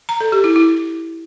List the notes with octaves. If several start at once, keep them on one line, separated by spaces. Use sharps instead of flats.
A#5
A4
G4
E4
E4